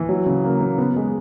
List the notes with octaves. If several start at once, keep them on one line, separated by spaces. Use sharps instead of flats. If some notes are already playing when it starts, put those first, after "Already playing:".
Already playing: E3
F#3
C#3
A#3
C#3
B3
G#3